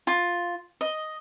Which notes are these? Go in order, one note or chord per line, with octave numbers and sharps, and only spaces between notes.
F4
D#5